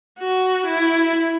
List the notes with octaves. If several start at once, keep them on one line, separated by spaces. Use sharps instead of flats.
F#4
E4